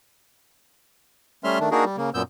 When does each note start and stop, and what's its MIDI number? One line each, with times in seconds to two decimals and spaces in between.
1.44 1.59 55
1.44 1.59 57
1.44 1.59 61
1.44 1.59 76
1.44 1.59 84
1.44 1.59 89
1.60 1.69 51
1.60 1.69 57
1.60 1.69 62
1.71 1.84 58
1.71 1.84 62
1.71 1.84 63
1.71 1.84 66
1.71 1.84 68
1.71 1.84 70
1.84 1.96 55
1.97 2.10 49
1.97 2.10 58
2.14 2.22 42
2.14 2.22 46
2.14 2.22 59
2.14 2.22 88
2.14 2.22 91